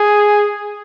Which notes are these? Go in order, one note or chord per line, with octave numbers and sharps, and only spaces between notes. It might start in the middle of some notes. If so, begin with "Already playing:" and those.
Already playing: G#4